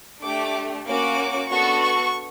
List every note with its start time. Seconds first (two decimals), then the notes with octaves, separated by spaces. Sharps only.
0.23 A3 D4 G4 D6
0.86 A#3 C#4 F#4 D6
1.50 B3 D4 F#4 A4 C#6
1.81 C#6